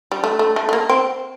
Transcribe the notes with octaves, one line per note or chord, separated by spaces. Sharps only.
G3
A3
A3
A3
A3
A#3
C4